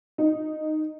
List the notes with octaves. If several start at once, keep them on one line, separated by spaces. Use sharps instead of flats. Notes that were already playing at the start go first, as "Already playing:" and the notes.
D#4